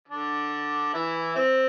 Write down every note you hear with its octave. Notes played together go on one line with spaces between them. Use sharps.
D3 D4
E3 E4
C4